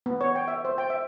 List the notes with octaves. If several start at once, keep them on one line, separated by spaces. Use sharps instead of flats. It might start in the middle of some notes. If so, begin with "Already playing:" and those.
B3
C#5
G5
E5
C5
G5
E5